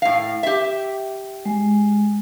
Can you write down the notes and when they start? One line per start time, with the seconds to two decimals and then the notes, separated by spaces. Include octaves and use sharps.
0.02 A2 F5
0.43 G4 E5
1.46 G#3